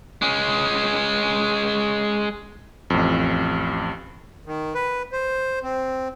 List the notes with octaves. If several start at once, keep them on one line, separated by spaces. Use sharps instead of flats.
G#3 C#4
A1 F2
D#3
B4
C5
C4